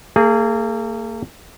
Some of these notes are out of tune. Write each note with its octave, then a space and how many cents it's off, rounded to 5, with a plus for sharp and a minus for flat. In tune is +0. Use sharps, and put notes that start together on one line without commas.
A#3 -40 G#4 +0